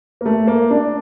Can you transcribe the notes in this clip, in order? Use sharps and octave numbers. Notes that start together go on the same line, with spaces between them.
A#3
A3
A#3
D4